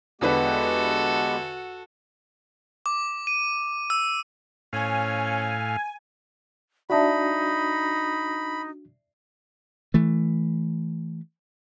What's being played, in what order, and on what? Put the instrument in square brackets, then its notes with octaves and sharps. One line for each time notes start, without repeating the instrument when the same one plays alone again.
[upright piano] E2 D3 B4 [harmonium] G#3 B3 G4 [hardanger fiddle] F#4 A4
[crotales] D6
D#7
E6
[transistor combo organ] A2 F5 [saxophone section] F3 C#4 [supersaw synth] G#5
[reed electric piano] D4 F#4 [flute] D#4 [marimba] D5 E5 A5 [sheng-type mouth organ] B5
[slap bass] E3 A3